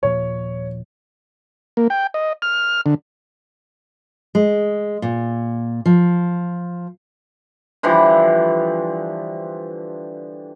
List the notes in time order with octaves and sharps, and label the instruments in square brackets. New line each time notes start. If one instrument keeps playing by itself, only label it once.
[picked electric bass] D#1 A#2 F3 [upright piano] C#5
[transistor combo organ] A#3
G5
D#5
F6
D3
[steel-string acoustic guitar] G#3
A#2
F3
[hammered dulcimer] D3 E3 F3 G3